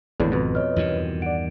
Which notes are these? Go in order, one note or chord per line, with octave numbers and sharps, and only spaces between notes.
G#1 E2 A2 D3 G#4 B4 D5
F2 B2 B4
C#5 D#5 F6
E2 G2 D#3 F#4
D5 F#5 D7